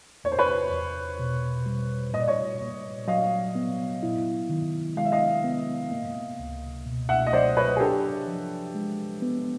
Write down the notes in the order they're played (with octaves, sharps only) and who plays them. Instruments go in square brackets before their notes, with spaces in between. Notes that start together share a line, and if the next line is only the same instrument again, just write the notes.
[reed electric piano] E2 [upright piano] C#5
[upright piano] C5
B4 C#5
[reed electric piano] E2
B2
G3
[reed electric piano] A#2 [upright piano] D#5
[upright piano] D5
C#5 D#5
[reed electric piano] A#2
[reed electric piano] F#3 [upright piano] D#5 F5
[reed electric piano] B3
E4
D#3
[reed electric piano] G#3 [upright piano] F5
[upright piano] E5
D#5 F5
[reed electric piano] B3
A#3
C#2
B2
[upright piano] E5 F#5
D#5
[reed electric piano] F#3 [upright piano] C5 D5
[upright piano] B4 C#5
G#4
[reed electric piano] D4 [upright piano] G4 A4
[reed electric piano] F3
G#3
B3